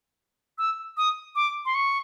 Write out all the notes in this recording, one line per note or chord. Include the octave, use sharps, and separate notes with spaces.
E6
D#6
D6
C6
C#6